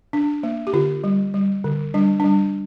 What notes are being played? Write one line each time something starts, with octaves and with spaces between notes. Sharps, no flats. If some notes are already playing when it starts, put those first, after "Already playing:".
D4
A#3
G4
D3 F4
G3
G3
D3
G3 D4
G3 D4